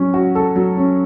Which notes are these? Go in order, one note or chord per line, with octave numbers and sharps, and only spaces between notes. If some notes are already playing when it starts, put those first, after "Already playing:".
Already playing: F#3 C#4
F#4
A4
F#3
C#4